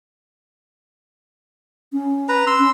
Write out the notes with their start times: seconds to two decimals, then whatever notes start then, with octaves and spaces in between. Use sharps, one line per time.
1.93 C#4
2.29 B4 A#5
2.47 C6 E6
2.59 C#4